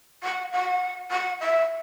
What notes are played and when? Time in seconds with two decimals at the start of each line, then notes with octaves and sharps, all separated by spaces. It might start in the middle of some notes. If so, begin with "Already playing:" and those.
0.23 F#5
0.52 F#5
1.11 F#5
1.40 E5